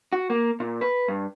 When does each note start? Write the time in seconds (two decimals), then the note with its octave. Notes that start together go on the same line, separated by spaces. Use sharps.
0.13 F#4
0.30 A#3
0.60 A#2
0.81 B4
1.08 G2